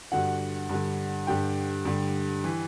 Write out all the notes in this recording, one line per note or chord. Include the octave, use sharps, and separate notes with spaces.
G2 D3 F#4 F#5
G2 D3
G2 D3 G4 G5
G2 D3
E3